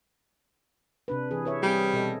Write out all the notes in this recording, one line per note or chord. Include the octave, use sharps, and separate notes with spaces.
C3 D4 B4
E3 G#4
B4 C#5 E5
G3 C4 G#4
B2 A4 D#5